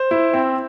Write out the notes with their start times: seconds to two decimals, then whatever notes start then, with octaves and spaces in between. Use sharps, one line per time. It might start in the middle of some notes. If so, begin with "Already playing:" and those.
Already playing: C5
0.11 E4
0.34 C4